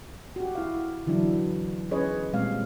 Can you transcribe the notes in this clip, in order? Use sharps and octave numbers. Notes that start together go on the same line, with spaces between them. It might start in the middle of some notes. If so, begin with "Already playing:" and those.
F#4 G4
E4 F5
D3 E3 F#3 D4 E4
C#4 G#4 B4 C#5 D#5
A#2 G3 G#3 C4 F5